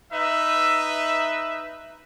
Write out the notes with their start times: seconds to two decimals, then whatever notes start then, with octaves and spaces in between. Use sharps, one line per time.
0.12 D#4 B4 E5